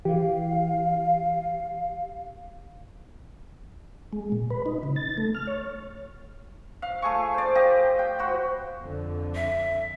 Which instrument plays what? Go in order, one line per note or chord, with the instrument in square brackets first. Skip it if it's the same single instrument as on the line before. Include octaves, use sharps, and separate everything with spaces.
[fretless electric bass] E3 [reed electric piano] G4 [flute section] F5
[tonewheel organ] G#3
A#2
B4
D#4
C#3
A6
A3
F6
C#5
[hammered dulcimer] F5
A3 G#4 C#6
C5 D5
G4 D#5 F5
G5
F#4 C5 B5
[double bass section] F2 D3
[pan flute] E5